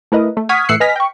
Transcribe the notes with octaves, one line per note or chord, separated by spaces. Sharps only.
A3 E4 A#4 B4 D#5
A3
F#5 C#6 D#6 F6 G#6 B6
A2 E3 E6 F#6 C7 C#7
B4 D#5 G#5 F6 A#6 B6
G5 C#6